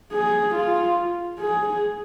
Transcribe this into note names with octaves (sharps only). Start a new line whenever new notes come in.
G#4
F4
G#4